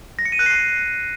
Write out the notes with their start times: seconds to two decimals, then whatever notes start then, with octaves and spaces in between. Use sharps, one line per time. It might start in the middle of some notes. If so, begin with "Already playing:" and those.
0.19 A#6
0.25 C#7
0.32 D#7
0.39 F#6
0.46 C7